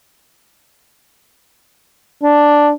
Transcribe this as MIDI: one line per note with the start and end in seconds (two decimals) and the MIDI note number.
2.23 2.70 62